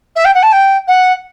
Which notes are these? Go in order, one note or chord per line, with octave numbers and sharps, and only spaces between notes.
E5
G5
F#5
A5
G5
F#5